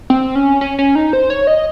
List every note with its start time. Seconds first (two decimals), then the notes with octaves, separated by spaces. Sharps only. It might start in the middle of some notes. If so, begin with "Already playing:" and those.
0.10 C4
0.35 C#4
0.61 C#4
0.79 C#4
0.95 D#4
1.13 C5
1.30 C#5
1.47 D#5